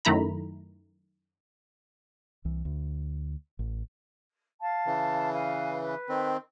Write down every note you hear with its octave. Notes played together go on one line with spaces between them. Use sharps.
F#2 D#3 A3 E4 A#5 B5
C2 E3
D2
A1
F5 A5
C#3 E3
B4 F5 G#5
B4
D#3 C4